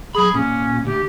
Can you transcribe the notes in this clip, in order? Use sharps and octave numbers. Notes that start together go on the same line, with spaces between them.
F#3 G#4 B5
A#2 C#4
D2 G4